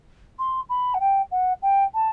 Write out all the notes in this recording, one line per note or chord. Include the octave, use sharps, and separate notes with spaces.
C6
B5
F#5
G5
F#5
G5
A5